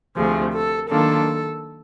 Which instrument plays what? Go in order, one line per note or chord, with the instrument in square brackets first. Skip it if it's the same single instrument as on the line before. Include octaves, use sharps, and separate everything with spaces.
[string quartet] D2 C3 F3 A3 [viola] G#4
[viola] A4
[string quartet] D#3 F#3 A#3 D4 F4 [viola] A4